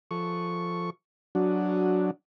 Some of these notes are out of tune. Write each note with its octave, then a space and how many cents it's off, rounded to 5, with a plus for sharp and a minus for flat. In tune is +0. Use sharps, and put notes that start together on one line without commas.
F3 +0 A4 +0 C#6 +0
F#3 +0 D4 +0 F#4 -10